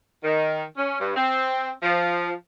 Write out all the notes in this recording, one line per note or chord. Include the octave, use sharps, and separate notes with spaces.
D#3
C#4
G2
C4
F3